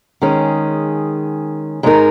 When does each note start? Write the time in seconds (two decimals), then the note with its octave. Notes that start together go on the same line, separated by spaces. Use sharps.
0.22 D#3 G#3 C#4 G#4
1.83 G#2 G#3 D#4 A#4